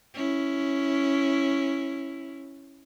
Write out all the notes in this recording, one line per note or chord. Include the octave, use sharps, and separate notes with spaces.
C#4 E4